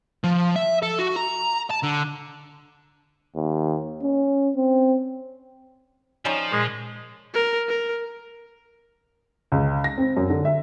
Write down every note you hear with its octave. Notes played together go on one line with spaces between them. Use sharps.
F3
E5
A4
F#4
A#5
A5
D3
D#2
C#4
C4
F3 G3 C#4 D#4
A#2 G#3
A#4
A#4
C#2
A#6
C4
F#2
D3
E5